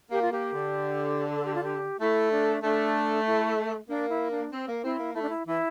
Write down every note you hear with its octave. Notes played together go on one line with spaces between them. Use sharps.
A#3 G4
F4
A#3 G4
D3
A4
G4
F4
G4
A3 E4
D4
A3 D4
E4
A#3 D4
E4
D4
C4
A#3
C4 E4
A#3
A3 E4
D4
E4
E3 E4